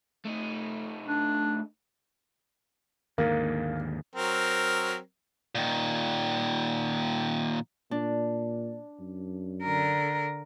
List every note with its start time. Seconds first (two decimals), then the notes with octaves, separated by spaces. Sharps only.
0.25 A3 D#4
1.08 D4
3.18 D#2 G#2 D3 A#3
4.16 F#3 C4 A#4
5.55 A#2 D#3
7.91 A#2 D4
9.00 F#2
9.63 D3 A#4